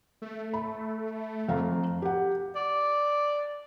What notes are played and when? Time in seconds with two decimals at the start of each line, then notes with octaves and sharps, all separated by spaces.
0.22 A3
0.54 B5
1.49 F2 F5 A#5
2.02 G4 F#5
2.56 D5